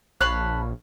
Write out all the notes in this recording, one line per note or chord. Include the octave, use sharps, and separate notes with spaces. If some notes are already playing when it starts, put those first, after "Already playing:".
A#1 C#5 F5 A5 B5 F#6